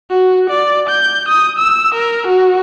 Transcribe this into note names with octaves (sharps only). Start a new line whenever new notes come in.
F#4
D5
G6
D#6
E6
A#4
F#4